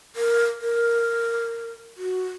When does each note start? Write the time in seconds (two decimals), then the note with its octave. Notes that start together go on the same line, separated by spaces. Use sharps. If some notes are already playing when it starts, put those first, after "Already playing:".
0.16 A#4
0.61 A#4
1.97 F#4